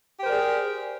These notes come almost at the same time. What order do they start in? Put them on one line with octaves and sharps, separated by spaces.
G4 C5 A#4 D5 G#4